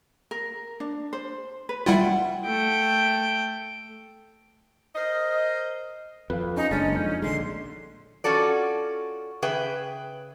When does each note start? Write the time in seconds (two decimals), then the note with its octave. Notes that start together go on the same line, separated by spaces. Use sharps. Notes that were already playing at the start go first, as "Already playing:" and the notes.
0.31 A#4
0.80 D4
1.13 C5
1.69 B4
1.86 G3 E4 F4 E5 F#5 G5
2.45 A3 G5
4.95 A#4 C5 D#5
6.30 F2 B4 F5
6.57 C#4 D#4
6.71 F#1 G#3 C#4 D4 A6
6.95 F2 D#4 G6
7.22 A#1 D3 G#3 C6
8.24 C#4 F4 F#4 A4 D5
9.42 C#3 G#4 B4 E5 G5